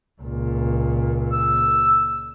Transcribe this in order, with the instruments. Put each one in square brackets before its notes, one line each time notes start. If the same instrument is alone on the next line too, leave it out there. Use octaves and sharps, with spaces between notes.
[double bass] C#2 A#2
[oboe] E6